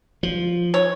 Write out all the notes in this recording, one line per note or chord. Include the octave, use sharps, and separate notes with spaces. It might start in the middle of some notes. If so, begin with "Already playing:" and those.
F3
C#5